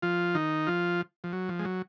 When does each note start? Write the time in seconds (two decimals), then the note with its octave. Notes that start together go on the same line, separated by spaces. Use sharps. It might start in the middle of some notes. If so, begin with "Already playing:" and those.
0.02 F3 F4
0.35 D#3 D#4
0.67 F3 F4
1.24 F3
1.33 F#3
1.49 F3
1.59 G#3
1.65 F#3